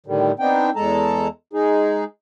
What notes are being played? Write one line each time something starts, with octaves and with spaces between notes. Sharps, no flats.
A2 D3 D#3 G3
B3 C4 D4 D#4 G5
E2 G#3 A4 A5 A#5
G#3 D#4 G#4